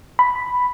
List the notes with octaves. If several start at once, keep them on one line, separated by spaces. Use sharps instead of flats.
B5